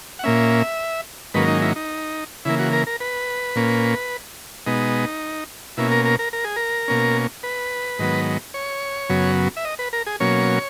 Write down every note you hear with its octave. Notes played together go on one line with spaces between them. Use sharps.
F#5
A#2 A#3 C#4 E5
G#2 D#3 F#3 A#3 C#4 B4
D#4
E4
D#4
C#3 E3 A#3 E4
F#4
A#4
A#4
B4
A#2 A#3 C#4
B2 G#3 B3 D#4
B2 A#3 C#4 E4
A#4
A#4
A#4
A#4
G#4
A#4
B2 A#3 C#4
B4
G#2 D#3 F#3 B3
C#5
F#2 C#3 F#3 B3
E5
D#5
B4
A#4
G#4
B2 F#3 A#3 C#4 C#5